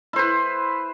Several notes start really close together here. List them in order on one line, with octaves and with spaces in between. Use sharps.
E4 C5 B4